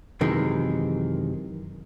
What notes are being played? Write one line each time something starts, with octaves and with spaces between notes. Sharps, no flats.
F#2 C3 D#3 E3 G#3